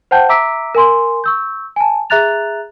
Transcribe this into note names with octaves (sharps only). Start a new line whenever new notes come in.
C5 F#5 G5 A5 G6
E5 A#5 D6 E6 B6 D7
A#4 G#5 C6
C#6 E6 G6
G#5 A5
G#4 E5 A#5 F#6 A6 F7